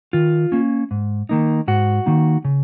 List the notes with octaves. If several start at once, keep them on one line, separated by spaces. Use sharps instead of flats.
D#3 F4
A#3 C#4
G#2
D#3 A#3 D#4
G#2 F#4
D#3 A#3 D#4
C#3